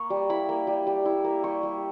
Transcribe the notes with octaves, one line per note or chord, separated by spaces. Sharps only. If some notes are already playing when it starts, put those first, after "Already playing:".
Already playing: A#3 C#6
G3
E4 B5
A#3
G3
G3
E4
A#3
G3 C#6
G3